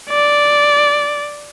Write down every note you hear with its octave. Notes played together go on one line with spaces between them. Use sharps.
D5